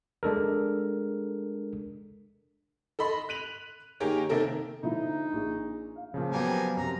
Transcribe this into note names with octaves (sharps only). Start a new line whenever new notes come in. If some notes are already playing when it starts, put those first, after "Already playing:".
G#3 D4 A4 A#4
A4 D#5 B5 C6
F#6 B6 D#7 F7 F#7
D#3 A#3 G4 G#4 A#4 C#5
C3 D#3 A#3 A4 A#4
D3 F3 D#4 E4
A#1 G#4
F5
A#2 C#3 F3
F#3 G3 A#3 B3 G#5
F#2 C3 A#5